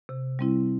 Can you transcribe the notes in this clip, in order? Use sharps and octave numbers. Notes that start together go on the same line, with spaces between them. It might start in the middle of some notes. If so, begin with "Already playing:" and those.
C3
G3 C4 E4